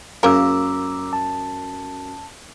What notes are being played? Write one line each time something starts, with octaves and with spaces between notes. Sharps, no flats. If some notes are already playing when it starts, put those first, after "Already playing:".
F#2 C#3 A#3 A#4 A#5 D6 E6
A5